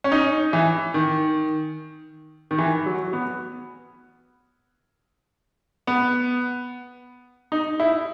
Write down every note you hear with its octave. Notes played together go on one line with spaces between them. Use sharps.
C#4
D#4
E3
D#3
D#3
E3
F#3
B3
B3
D#4
E4